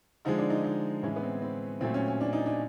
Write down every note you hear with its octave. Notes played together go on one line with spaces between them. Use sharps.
D3 F3 G#3 D#4
D4
D#4
D#4
A2 E3 G#3 C#4
B3
C4
C4
A#2 F#3 A3 C4
C#4
C#4
D4
D#4
D4